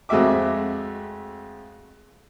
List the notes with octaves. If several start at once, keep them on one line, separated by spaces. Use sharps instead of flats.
F2 G#3 A3 F#4 E5 D6